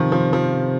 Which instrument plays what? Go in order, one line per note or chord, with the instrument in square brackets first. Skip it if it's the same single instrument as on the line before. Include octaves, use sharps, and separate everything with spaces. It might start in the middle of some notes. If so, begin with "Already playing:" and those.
Already playing: [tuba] C3 [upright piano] D#3 F3
[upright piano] F3
F3